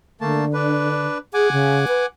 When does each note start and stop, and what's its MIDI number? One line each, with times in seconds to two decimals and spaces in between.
0.21 1.06 50
0.21 0.45 57
0.21 0.45 58
0.21 0.45 81
0.54 1.18 62
0.54 1.18 71
1.34 1.52 68
1.34 2.06 78
1.34 2.06 80
1.34 2.06 86
1.52 1.85 49
1.88 2.04 71